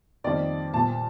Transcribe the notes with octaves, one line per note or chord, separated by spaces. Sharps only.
F2 D#3 G3 A#3 D5
A#2 G3 A#3 A5